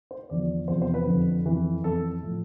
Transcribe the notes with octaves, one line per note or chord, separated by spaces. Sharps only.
C5
E2 D3 F3 D5
E2 C3 F3 C5
C5
B4
F2 D3 F3
F2 E3
F2 E3 A4
A2 F3